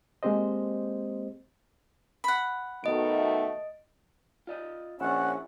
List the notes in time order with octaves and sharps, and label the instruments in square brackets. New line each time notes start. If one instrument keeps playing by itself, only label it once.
[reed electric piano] G#3 A#3 C4 G4 C5 D#5
[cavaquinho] F#5 B5
[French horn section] B2 D#3 A3 [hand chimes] D#5 D7
[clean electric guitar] F4 D5 D#5
[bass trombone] A#1 [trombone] C#4 [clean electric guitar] E4 D5 [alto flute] F#5